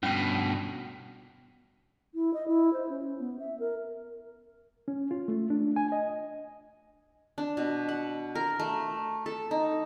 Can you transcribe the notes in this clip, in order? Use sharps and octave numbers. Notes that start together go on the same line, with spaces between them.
G2 B2 C#4 G5
E4
D#5
E4
C5
C#4
B3
E5
A#4
C#4
F4
A3
D4
G#5
D#5
D4
B2
F#5
A#4
A3
A4
D#4